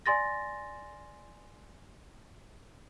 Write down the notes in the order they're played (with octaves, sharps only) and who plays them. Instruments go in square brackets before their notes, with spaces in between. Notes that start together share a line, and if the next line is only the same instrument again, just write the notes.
[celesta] D5 G#5 C6 A6 A#6